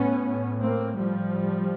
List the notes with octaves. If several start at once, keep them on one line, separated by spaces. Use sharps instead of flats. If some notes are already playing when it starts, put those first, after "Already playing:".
Already playing: A2 B3 C#4
A#3 C4
F3 G3